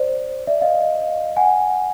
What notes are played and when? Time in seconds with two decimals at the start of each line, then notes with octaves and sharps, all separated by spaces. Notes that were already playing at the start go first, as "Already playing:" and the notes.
Already playing: C5 D5
0.47 D5 E5
0.61 D#5 F5
1.36 F#5 G#5